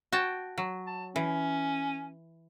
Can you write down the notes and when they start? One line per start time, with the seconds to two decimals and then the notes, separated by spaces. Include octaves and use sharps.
0.12 F#4 G5 A5
0.58 F#3
0.87 A5
1.16 E3 C#4